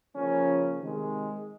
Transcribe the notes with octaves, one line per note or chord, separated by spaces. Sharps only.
C#3 F3 A#3 C#4
C3 D#3 G#3